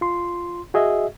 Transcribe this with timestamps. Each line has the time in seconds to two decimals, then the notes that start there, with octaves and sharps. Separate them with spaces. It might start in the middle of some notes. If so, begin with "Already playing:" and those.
0.01 F4 C6
0.74 F#4 G#4 D#5 E5